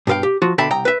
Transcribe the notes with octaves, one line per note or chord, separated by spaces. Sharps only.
G2 B2 A#4 F5 G5
G4
F3 F4 F#4
B2 D3 E5 G5 A5 B5
C2 G5 A#5
B4 E5